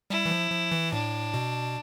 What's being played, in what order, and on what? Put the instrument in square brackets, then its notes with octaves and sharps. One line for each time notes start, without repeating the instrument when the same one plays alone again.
[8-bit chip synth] G3 [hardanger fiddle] E4
[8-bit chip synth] E3
F3
F3
E3
[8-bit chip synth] A2 [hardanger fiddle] D4
[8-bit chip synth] B2